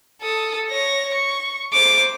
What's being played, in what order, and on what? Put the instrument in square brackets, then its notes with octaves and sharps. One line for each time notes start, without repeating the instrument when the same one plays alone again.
[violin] A4 D#6
C#5 A#6
C#6
[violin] C5 [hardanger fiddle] D6